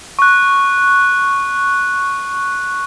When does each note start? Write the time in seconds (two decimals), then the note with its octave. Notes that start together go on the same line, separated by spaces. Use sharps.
0.19 C#6 F#6